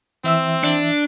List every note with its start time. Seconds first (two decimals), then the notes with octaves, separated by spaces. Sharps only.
0.24 E3 C4 E5 E6
0.64 D4